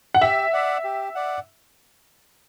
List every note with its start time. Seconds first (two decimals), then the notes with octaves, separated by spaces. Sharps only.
0.15 F#5
0.21 G4 E5
0.53 D5 F#5
0.84 G4
1.15 D5 F#5